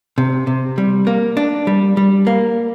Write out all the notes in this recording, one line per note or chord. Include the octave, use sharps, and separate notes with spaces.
C3
C3
G3
A#3
D4
G3
G3
A#3